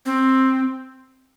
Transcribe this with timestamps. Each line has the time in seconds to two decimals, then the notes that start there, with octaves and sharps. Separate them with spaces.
0.06 C4